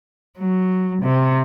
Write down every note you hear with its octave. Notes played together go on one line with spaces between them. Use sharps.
F#3
C3